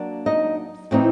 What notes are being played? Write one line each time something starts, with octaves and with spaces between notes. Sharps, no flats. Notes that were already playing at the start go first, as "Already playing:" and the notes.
Already playing: F#3 A#3 D4
D#4 D#5
A2 E3 A3 C4 D#4